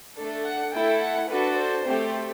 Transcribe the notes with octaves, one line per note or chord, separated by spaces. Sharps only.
A3 D4 A4
F#5
A3 E4 A4 G5
F#5
D4 F#4 A4 B4
C5
A3 C4 G4 C5